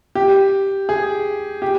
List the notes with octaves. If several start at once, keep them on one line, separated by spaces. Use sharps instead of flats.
G4
G#4
G4